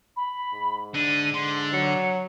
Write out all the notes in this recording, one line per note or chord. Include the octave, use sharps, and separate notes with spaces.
B5
G#2
D3 D#7
D3 C6
F#3 C#7